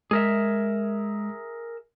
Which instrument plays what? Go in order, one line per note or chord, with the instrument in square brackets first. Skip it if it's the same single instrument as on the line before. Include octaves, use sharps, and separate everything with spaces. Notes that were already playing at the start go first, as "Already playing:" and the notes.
[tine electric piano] G#3 [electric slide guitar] G#4 A#4 E5